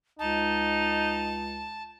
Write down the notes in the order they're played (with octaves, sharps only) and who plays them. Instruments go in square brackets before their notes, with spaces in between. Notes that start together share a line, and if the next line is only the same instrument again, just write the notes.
[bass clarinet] C#2 [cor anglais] D#4 [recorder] A5